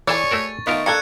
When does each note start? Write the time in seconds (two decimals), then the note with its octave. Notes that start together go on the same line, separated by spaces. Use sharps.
0.07 E3 G#4 A4 C#5 D5 C#6 A6
0.31 A3 F#4 A#4
0.67 D#3 A3 B3 F4 A#4
0.86 A#3 D4 A4 F#6 G#6 C#7